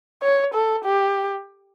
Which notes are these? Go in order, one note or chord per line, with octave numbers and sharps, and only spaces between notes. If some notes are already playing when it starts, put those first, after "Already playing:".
C#5
A4
G4